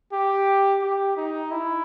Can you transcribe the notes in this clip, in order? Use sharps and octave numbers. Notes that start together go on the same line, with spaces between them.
G4
G4
D#4
E4